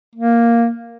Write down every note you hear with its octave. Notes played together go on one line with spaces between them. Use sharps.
A#3